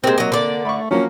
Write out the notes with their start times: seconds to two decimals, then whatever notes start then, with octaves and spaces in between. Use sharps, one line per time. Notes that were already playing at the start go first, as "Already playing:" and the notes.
0.04 C3 G#3 A#3 C4
0.18 F#3 D#5
0.32 D3 D5
0.65 A3 B5 C#6
0.91 F3 F#3 A#3 C#4